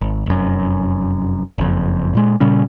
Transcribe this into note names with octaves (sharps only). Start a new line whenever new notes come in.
G#1
F1 F#2
F#1 F2
A#2 G#3
A#2 C#3 G3 C#4